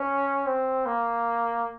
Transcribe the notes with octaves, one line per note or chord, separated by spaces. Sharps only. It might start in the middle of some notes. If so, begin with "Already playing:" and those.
Already playing: C#4
C4
A#3